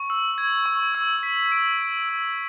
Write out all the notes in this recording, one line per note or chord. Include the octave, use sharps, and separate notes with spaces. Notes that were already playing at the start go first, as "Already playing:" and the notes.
Already playing: C#6
E6
G#6
C#6
E6
B6
D7
D7
E6